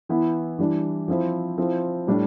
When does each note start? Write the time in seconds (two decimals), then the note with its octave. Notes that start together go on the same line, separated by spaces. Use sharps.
0.09 E3 B3 E4
0.59 E3 G3 D4
1.08 F3 C4 E4
1.58 F3 C4 E4
2.07 A2 G3 D4